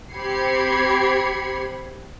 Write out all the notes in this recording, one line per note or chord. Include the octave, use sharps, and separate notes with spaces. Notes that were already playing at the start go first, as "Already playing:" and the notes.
C4 G4 B5 G#6 C7 C#7